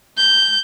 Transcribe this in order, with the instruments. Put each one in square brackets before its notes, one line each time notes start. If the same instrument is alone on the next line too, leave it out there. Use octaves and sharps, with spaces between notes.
[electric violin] G6